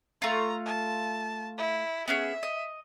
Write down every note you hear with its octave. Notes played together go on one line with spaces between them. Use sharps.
A3 F4 A#5
A5
E4
B3 C#4 G#4 E5
D#5